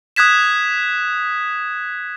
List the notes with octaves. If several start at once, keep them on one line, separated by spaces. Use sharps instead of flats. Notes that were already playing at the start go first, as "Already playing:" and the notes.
D#6 F#6 G#6 B6 E7